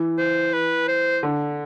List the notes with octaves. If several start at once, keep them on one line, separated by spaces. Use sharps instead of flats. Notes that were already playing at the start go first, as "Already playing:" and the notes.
Already playing: E3
C5
B4
C5
D3